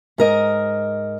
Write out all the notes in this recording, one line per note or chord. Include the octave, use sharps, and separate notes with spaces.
G#2 A#4 D#5